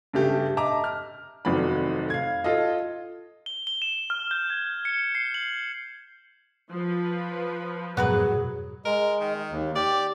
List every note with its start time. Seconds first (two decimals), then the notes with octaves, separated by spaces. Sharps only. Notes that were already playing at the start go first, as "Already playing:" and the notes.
0.13 G2 C#3 A3 G4
0.57 D#5 E5 A5 A#5 D6
0.84 F6
1.45 F1 F2 D#3 F#3 D5 B5
2.10 F5 G#6
2.44 F4 A4 D#5
3.46 G7
3.67 G7
3.82 E7
4.10 F6
4.31 G6
4.50 G#6
4.85 C#7
5.15 C7
5.34 F#7
6.71 F3 B4
7.97 F2 G#2 B2 F#3 B3 G#4 A#4 B4
8.85 G#3 A#4
9.20 D#3
9.51 D#2
9.76 G4 D5